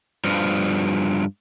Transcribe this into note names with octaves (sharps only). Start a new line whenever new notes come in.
G2 F3